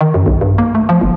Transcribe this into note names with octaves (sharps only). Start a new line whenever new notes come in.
D#3
F#2
B1
G2
A#3
A3
F3
G1